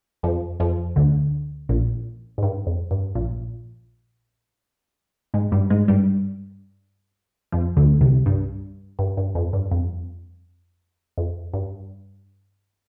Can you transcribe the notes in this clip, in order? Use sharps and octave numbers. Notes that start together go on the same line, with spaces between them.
F2 F3
F2 F3
D2 D3
A#1 A#2
G#2
G2
F2
G2
A#1 A#2
G#2 G#3
G2 G3
G#2 G#3
G2 G3
F2 F3
D2 D3
C2 C3
G2
G2
G2
F2
G2
F2
F2
G2